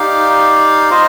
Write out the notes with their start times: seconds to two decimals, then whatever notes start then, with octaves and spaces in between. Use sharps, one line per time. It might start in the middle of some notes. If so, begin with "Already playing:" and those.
Already playing: D#4 G4 D5 F5
0.90 F4 C5 D#5